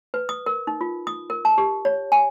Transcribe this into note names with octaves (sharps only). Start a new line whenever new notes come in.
B4
D#6
A#4
D#4
F4
D#6
A#4
A5
G4
C#5
G#5